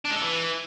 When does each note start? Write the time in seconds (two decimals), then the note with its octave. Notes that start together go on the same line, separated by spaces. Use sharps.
0.05 D4
0.11 G#3
0.16 A4
0.22 E3